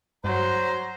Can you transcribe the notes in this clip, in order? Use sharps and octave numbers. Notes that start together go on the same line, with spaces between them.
G2 F#3 C5 A#5